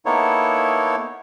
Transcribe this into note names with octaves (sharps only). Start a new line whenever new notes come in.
A#3 B3 D#4 E4 A4 C#5